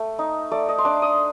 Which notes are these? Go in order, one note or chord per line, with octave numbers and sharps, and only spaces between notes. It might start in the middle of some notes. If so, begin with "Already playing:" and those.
Already playing: A3
D#4
A3 D5
D#5
C6
D4 D6
D#6